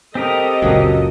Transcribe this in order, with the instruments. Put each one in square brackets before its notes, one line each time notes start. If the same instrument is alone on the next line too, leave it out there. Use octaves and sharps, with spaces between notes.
[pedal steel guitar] C4 G4 A#4 [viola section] A4 D#5
[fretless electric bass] F#1 C#2 A#2 [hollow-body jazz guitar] F#3 A#3